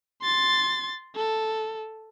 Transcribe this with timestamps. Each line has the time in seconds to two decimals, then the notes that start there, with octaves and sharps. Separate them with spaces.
0.22 C6 A6
1.16 A4